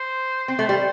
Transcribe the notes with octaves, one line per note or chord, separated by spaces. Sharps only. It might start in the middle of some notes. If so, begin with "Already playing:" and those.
Already playing: C5
C4 C5
A3
G3